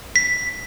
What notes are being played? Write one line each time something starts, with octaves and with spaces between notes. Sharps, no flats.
B6